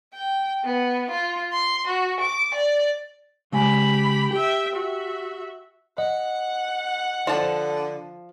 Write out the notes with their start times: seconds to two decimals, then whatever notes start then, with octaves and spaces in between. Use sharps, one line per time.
0.14 G5
0.64 B3
1.11 F4
1.52 C6
1.87 F#4
2.20 D6
2.55 D5
3.52 C#3 G#3 G4 G#5 B5
4.31 G4 E5 G5
4.75 F#4 E5
5.98 D#5 F#5
7.27 D3 F3 A5